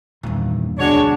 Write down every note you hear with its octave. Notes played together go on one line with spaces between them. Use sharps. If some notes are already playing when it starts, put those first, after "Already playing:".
E2 G2 A#2 D#3 E3
D2 B2 D3 G#3 D4 F#4 C#5